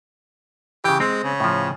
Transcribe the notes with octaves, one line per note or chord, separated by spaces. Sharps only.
C#3 E3 G4
G#3 C4
C#3
A2 F3